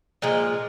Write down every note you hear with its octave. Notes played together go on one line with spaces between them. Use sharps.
A#2 F3 G#3